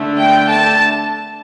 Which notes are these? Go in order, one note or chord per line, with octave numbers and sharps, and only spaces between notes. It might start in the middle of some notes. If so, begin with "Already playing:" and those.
Already playing: D3 A3 D4
G5
A5